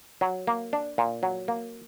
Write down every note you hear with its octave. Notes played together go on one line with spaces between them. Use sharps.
F#3
A#3
D4
A#2
F#3
A#3